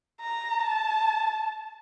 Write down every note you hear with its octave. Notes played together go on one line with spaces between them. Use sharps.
A#5
A5